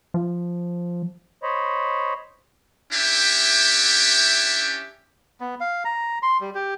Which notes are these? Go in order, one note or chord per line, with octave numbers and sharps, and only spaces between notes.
F3
C5 C#5 D#5 B5
C#4 D4 E4 G4 E5 G5
B3
F5
A#5
C6
G3
G4